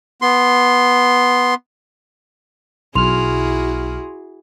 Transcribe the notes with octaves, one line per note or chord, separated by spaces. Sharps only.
B3 C6
B1 E4 F#4 G#4 C6 F6 F7